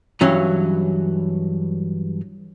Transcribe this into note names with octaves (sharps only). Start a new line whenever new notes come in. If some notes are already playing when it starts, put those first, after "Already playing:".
G2 E3 F#3 C#4